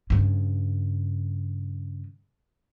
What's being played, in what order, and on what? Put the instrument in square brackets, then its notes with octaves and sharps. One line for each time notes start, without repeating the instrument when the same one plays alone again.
[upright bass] G2 C#3